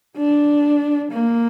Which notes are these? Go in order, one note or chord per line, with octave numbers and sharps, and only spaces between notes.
D4
A#3